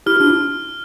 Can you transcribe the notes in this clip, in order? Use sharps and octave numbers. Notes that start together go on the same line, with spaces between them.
E4 G4 F6
D4 F4